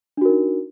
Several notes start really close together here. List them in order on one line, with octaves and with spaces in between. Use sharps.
D4 F#4 A#4 D#4